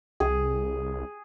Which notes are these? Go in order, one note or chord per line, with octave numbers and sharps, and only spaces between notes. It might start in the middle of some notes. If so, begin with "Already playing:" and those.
C2 G#4